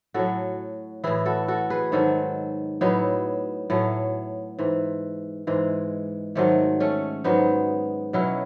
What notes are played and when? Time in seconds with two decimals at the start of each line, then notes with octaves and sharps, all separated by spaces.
0.14 A2 F#3 F#4 A4
1.04 A2 E3 E4 G#4
1.26 F#4 A4
1.48 F#4 A4
1.70 G#4 B4
1.92 G#2 D#3 F#3 F#4 A4
2.81 A2 F#3 B3 D#4
3.70 A2 F#3 A3
4.59 G#2 E3
5.47 G#2 E3 G#3
6.35 G#2 D#3 F#3 A3
6.80 A3 C#4
7.24 G#2 F#3 B3 D#4
8.13 B2 F#3 C#4 E4